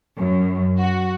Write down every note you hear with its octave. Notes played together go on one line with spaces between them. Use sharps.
F#2
F#4